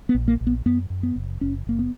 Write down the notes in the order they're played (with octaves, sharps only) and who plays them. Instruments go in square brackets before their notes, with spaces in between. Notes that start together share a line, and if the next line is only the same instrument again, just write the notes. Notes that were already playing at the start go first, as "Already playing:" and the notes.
[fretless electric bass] B3
A#1
A#3
A#1
B3
F#2 B3
F#2
B3
F#1
F#1 C#4
F#1 A#3
B3